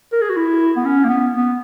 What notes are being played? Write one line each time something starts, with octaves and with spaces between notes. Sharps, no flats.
A#4
G#4
F#4
E4
B3
C#4
A#3
B3
B3